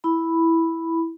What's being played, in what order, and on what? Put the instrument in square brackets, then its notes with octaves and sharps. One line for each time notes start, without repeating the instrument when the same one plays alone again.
[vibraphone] E4 B5